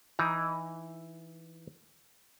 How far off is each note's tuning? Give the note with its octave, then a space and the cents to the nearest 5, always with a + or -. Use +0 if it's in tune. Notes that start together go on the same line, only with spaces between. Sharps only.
E3 +0 D#4 +20 A#5 +30